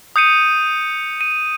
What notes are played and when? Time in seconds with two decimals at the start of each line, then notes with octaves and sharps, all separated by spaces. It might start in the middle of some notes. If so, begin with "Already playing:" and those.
0.16 D#6 G6 C#7 D#7
1.21 D#7